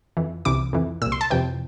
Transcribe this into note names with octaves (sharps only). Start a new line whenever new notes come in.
F2 E3
C2 C3 E3 D6
F2 E3
C2 A#2 E6
C6
A5
F2 C3 E3 G5